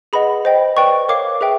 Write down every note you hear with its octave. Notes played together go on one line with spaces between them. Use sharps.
G#4 B4 D#5 F#5 B5
C5 D#5 G5
B4 D5 G5 C#6
A#4 C#5 F5 D6
G#4 B4 E5 G5